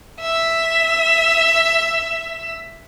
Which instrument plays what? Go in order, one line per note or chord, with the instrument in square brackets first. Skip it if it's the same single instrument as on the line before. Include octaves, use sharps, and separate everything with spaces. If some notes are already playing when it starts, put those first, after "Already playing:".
[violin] E5 E6